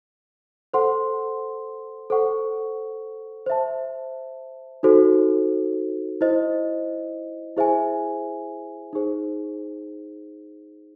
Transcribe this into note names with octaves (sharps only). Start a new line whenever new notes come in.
A4 C5 F#5 C6
A4 C5 F#5 C#6
C5 E5 A5
D#4 F#4 A4 C5
E4 C5 D#5
E4 G#4 C5 E5 G#5
D#4 G#4 C5